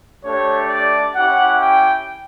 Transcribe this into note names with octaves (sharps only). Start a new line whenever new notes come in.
A3 D4 G4 C#5
D5
C#4 E4 G4 F#5
G5